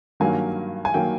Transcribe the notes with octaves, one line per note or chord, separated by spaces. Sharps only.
G2 D#3 F#3 A#3 G#5
G#5
D#3 F#3 A#3 G5